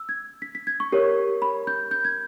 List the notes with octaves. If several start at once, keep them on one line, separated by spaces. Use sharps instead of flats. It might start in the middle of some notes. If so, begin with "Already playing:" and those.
Already playing: E6
G#6
B6
B6
G#6
C#6
G4 A#4 C#5
B5
G6
G6
G#6